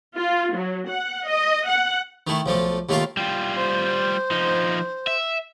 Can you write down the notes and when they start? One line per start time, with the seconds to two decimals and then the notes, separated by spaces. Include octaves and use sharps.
0.16 F4
0.54 F#3
0.87 F#5
1.27 D#5
1.66 F#5
2.27 D#3 A3 E4
2.46 B1 F3 A3 D6
2.89 D#2 A3 A#3 F4 F5 C6
3.17 G3 F4 G5
3.56 C5
4.31 F3 D#4
5.07 E5